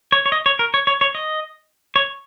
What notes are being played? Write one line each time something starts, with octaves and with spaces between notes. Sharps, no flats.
C#5
C#5
D#5
C#5
A#4
C#5
C#5
C#5
D#5
C#5